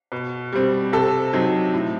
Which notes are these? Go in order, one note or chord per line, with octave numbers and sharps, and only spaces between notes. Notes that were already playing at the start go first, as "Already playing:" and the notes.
B2
G3 C4
C3 A4
F#3 C4 D#4
A2